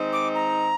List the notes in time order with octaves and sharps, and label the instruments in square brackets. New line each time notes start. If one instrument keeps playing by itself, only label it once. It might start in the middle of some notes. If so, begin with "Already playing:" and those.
Already playing: [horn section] D#3 G#3 C4 D#4
[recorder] D6
A#5